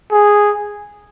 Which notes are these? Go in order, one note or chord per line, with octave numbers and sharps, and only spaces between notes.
G#4